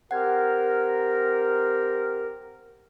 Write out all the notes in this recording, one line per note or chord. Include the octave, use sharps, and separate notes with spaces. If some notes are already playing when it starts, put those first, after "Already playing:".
C4 G4 A#4 F#5 G#6